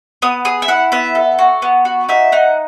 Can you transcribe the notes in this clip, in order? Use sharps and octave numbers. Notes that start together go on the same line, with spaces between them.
B3 D#6
G#4 D#6
E5
E4 F#5
B3 E5
A4
F#4
B3
F#4
D#4 E5
D#4 F#5